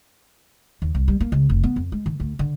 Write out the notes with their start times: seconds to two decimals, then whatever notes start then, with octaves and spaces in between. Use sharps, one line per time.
0.82 D#2
0.95 C2
1.08 G3
1.21 A#3
1.32 C#2
1.49 F1
1.64 B3
1.76 F2
1.92 G#3
2.06 D#3
2.20 D2
2.39 D3